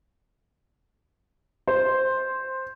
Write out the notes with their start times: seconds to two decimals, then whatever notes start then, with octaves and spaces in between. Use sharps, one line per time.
1.67 C5